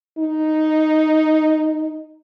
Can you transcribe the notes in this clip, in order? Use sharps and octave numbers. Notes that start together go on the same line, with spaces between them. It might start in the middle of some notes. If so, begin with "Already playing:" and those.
D#4